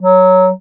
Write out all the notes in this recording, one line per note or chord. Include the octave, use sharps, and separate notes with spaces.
F#3